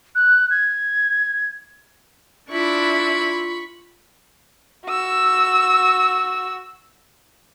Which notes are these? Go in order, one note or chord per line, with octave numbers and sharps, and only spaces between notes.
F#6
G#6
D4 E4 F4 B5 C#6
F#4 E6